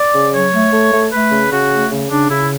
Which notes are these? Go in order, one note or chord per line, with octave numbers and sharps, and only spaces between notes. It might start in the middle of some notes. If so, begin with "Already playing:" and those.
Already playing: D5
C#3
F#3 C#5
A3
A3
A3
A3 B4
C#3
C#3 F#4
A3
C#3
C#3 D4
C#3 E4